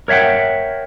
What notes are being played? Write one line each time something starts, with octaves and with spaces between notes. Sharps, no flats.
A#4 C#5 E5 F#5 G5